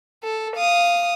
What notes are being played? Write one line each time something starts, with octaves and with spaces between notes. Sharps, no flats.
A4
F5 D#6